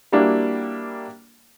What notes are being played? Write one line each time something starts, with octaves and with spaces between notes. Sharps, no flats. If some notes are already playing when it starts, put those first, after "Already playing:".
G3 A#3 D4 E4 F#4